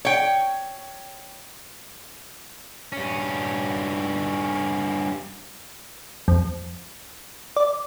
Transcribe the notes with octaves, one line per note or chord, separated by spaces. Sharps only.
C#5 G5
G2 C#4
F2
D5